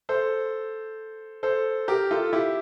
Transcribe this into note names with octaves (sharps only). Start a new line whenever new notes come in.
A4 C5
A4 C5
G4 A#4
F4 A4
E4 G4